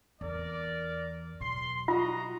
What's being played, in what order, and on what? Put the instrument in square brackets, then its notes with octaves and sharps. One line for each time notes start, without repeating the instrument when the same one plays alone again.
[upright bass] E2 [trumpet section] A#4 D5
[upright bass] B2 F#3 [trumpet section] C6
[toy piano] F4 [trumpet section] F#4 D#5 A#5